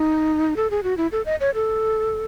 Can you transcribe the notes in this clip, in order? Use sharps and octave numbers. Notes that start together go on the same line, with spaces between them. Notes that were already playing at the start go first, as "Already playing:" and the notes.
Already playing: D#4
A4
G#4
F#4
E4
A4
D#5
C#5
A4